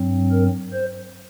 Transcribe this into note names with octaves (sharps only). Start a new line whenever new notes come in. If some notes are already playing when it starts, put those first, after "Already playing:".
Already playing: G2 F#3 C4
A#4
C5